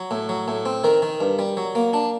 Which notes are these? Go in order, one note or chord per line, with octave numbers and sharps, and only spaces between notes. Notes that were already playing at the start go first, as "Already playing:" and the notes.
Already playing: F#3
A2
F#3
A2
C4
D#3 A#4
D#3
G2
G3
F#3
A#3
D4